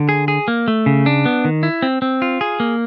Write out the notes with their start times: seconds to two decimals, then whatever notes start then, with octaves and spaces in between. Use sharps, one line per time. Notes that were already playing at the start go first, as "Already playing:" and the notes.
Already playing: D3
0.09 G#4
0.28 G#4
0.48 A#3
0.68 A3
0.86 C#3
1.06 D4
1.26 B3
1.45 D#3
1.63 E4
1.82 C4
2.02 C4
2.22 F4
2.41 G#4
2.60 A#3